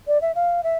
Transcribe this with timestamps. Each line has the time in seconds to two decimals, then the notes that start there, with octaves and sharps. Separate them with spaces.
0.07 D5
0.22 E5
0.35 F5
0.64 E5